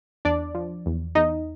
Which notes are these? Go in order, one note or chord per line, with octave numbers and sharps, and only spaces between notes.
E2 D4 D5
F3
E2
E2 D#4 D#5